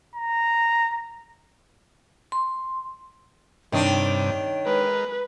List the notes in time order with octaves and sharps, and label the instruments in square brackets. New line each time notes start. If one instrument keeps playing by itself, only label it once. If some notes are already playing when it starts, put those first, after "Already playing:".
[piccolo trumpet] A#5
[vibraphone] C6
[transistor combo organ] G2 C3 [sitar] D#3 D4 [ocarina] C#5
[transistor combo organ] G#3 A#4 [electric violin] B4